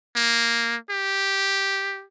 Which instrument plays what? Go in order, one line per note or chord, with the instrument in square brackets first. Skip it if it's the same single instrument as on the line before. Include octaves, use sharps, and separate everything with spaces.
[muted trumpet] A#3
G4